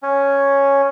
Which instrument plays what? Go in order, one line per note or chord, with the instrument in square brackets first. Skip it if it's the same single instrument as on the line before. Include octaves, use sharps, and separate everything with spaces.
[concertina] C#4